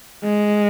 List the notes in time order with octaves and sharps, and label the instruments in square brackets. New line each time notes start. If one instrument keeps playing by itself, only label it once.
[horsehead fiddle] G#3